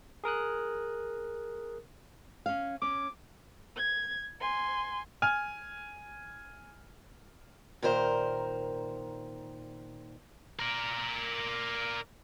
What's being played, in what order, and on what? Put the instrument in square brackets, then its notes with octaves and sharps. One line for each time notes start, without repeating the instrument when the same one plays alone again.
[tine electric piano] G#4 A#4 D#6 F#6
[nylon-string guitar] C#4 F5
[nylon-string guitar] C#4 [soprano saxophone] D6
[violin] G#6
G#5 C6
[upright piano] G#5 F6
[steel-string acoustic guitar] A#2 D#3 A#4 C5
[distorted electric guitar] A#4 D5